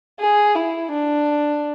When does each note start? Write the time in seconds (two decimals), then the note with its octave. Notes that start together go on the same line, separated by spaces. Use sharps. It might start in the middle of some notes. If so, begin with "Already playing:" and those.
0.20 G#4
0.55 E4
0.91 D4